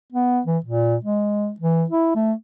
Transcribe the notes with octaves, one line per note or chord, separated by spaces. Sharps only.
B3
E3
A#2
G#3
E3
E4
A3